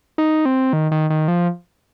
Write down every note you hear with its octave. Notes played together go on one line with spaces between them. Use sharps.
D#4
C4
D#3
D#3
D#3
F3